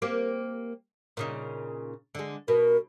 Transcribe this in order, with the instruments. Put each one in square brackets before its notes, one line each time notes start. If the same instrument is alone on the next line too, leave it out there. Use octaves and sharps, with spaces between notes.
[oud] A#3 C4 G4
A#2 C#3 D#4
D3 G#3
[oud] B2 [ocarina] A#4